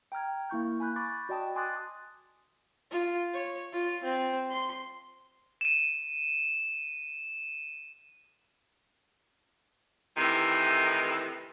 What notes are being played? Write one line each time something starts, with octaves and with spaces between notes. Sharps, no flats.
G5 A#5 F6 G#6
A#3 E4 C#6 G6
G#5 B5 F#6 G6
B5 C#6 D6 A6
F#4 D5 D#5 G5 A5 D#6
G#5 C6 D6 D#6 F#6 A6
F4
C#5
F4
C4
C6
D#7 E7
A2 C3 D#3 E3